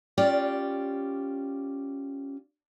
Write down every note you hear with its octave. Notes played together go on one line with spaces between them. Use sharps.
C#4 F4 G4 D5